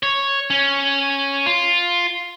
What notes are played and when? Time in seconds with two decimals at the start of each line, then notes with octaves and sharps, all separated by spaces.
0.03 C#5
0.50 C#4
1.46 F4